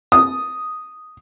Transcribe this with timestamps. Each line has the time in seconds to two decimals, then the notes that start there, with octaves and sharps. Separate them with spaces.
0.12 D#6